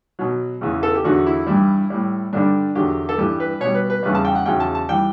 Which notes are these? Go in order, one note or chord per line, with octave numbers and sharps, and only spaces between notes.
B2 F#3
E2 C#3 E3
A4
G4
E2 D3 F#3 F#4
E4
G2 E3 G3 E4
A2 G3
G2 D3 G3 D4
E2 D3 F#3 G4
A4
G2 E3 G3 G4
B4
B2 G3 C#5
B4
B4
E2 C#3 G3 B4
A5
G5
F#5
E2 C#3 F#3 G5
A5
A5
E3 G3 G5